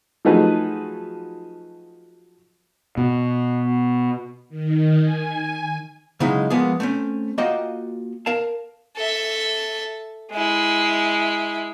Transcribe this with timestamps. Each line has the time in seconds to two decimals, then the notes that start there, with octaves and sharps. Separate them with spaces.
0.25 F3 F#3 A3 D#4 G#4 B4
2.97 B2
4.49 D#3
5.00 G#5
6.20 C#3 F#3 G#3 D#4 E4
6.50 F3 G#3 A#3 B3 G#4
6.80 A3 C4 C#4
7.38 A#3 F4 F#4 D#5 F5 G5
8.26 A#4 F5 A5
8.96 A4 E5
10.32 G#3 E4